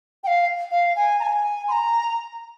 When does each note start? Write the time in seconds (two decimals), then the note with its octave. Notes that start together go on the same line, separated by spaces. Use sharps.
0.24 G5
0.27 F5
0.71 F5
0.96 G#5
1.20 A#5
1.23 G#5
1.68 C6
1.71 A#5